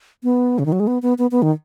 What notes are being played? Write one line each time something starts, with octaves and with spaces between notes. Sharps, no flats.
B3
C#3
D#3
F#3
G#3
B3
B3
B3
B3
D#3